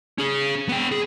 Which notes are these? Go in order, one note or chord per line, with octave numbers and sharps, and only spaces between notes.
C#4 G#4
B3 G5
G#4